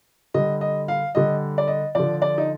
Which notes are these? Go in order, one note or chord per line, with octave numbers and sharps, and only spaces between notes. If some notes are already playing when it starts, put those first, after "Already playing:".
D3 G3 D#5
D#5
F5
D3 G3 D#5
D5
D#5
D3 F3 D5
D5
D#4